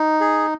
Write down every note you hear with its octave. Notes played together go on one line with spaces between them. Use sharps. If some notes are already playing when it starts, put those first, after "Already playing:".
Already playing: D#4
G#4